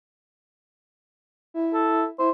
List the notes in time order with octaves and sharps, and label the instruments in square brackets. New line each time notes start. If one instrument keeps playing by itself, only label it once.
[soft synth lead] E4
[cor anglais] A4
[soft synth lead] E4 [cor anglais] C5